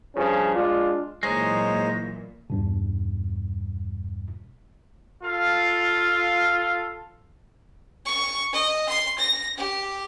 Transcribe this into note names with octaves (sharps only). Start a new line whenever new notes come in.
G2 C#3 F3 C#4
G#3 D4 F4
A#2 E3 F#3 G#3 D#4 C5 C#5
E2 G2 B2
F4 A4 F5
C#6
D#5
C6
A#6
G4